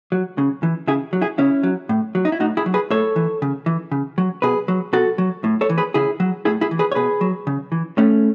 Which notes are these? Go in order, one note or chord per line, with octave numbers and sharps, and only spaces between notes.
F#3
C#3
E3
C#3 E4 G#4
F#3
E4 G#4
C#3 C#4 E4
F#3
A2
F#3
D#4
E4
A2 D#4 F#4
E4 G#4
F#3
G#4 B4
A2 A4 C#5
E3
C#3
E3
C#3
F#3
B2 G#4 B4
F#3
B2 F#4 A4
F#3
A2
A4 C#5
E3
G#4 B4
C#3 E4 G#4
F#3
A2 E4 G#4
E4 G#4
E3
G#4 B4
C#5
B2 G#4 B4
F#3
C#3
E3
A2 A3 C#4